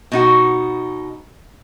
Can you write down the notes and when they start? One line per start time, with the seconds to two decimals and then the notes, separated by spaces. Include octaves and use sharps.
0.12 B2 D#4 F#4